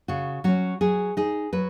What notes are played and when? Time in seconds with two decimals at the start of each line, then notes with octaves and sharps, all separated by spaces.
0.08 C#3 F#4
0.44 F#3 C#4 F#4
0.81 F#3 G#4
1.17 D#4 G#4
1.53 F#3 B4